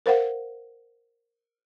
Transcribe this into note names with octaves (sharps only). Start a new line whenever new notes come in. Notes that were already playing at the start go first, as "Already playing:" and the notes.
A#4 C5 F5 F#5